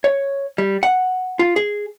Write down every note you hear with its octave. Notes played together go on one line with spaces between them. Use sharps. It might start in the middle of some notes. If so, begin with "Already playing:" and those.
C#5
G3
F#5
F4
G#4